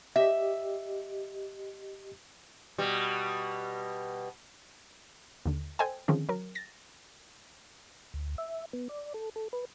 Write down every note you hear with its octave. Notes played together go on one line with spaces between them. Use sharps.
G4 D#5 E5
B2 G3
D#2 D3
A4 C5 D#5 G5 G#5
D3 D#3 F3 G#3 C4 C#4
F#3 A#4
A6 A#6
D2
E5
B3
D5
A4
A4
B4